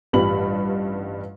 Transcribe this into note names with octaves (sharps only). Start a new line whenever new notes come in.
A1 G2 G3 F4 B5 F#7